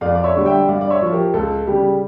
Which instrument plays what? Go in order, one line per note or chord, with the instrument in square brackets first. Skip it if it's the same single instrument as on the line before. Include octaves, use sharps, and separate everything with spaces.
[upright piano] F2 D5 F5
D5
C#5 E5
D3 G3
E5 G5
G2 D5 F5
D5
C#5 E5
F3
G4 A#4
C#2 A4
C#3 G3 G4